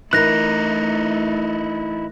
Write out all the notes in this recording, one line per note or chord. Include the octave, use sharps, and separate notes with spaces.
E3 A3 D#4 E4 A#4 F#6 A#6